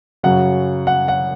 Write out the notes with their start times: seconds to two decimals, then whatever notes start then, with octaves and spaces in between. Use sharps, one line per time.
0.23 F#2 C#3 F#3 F#5
0.87 F#5
1.08 F#5